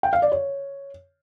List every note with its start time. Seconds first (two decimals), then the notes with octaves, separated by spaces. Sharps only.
0.03 G5
0.13 F5
0.22 D5
0.32 C#5